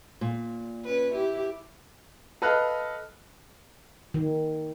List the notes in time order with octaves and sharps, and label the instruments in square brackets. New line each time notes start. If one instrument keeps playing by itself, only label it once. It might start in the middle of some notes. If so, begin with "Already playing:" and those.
[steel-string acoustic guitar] A#2
[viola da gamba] C#4 B4
E4 G4
[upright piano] A4 B4 D#5 F5 F6 F#6
[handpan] D#3